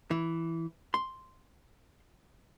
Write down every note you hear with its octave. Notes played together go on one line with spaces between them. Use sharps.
E3
C6